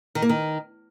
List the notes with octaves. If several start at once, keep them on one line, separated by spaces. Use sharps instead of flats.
D#3
A#3
D#3